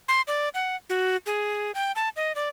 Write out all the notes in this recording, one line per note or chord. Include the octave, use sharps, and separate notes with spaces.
C6
D5
F#5
F#4
G#4
G5
A5
D#5
D5